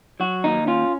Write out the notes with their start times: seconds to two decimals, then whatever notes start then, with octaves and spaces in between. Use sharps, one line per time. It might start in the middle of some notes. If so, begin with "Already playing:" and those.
0.20 F#3 F#4
0.44 D#2 D#4
0.67 C#4 F4